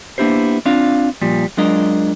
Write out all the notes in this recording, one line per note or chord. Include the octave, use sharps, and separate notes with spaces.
A#3 B3 D4 E4 G4 C5
C4 D4 F4 F5
A#2 F3 G3
F#3 G#3 D4 F4 A#4 D#5